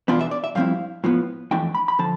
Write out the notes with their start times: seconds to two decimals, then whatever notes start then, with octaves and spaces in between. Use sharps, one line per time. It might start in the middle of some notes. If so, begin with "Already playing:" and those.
0.08 E2 B2 B3 D4 F4
0.21 E5
0.31 D5
0.44 E5
0.55 G2 F3 A3 C4 E4 F5
1.04 A2 F3 B3
1.51 F2 E3 A3 D4 G5
1.75 B5
1.88 B5
1.99 D3 F3 A5